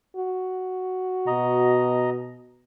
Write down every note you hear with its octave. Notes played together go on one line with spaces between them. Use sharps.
F#4
B2 D#5 A#5